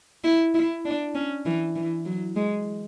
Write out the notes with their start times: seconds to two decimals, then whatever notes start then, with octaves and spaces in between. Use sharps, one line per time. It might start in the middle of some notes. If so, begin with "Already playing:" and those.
0.24 E4
0.54 E4
0.85 D4
1.15 C#4
1.46 E3
1.76 E3
2.06 F#3
2.36 G#3